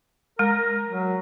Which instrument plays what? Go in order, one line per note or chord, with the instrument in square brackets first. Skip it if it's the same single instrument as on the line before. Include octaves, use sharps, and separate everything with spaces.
[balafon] G#3 [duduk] A#4
[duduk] F#3